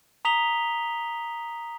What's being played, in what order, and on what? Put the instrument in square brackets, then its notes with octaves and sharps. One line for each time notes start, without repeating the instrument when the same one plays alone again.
[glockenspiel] A#5 D#6 B6 F7 G7